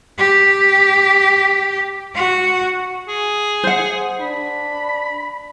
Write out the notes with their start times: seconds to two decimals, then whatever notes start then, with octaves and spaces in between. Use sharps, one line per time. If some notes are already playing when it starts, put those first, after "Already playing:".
0.19 G4
2.15 F#4
3.08 G#4
3.63 C5 F#5
4.21 D4 B5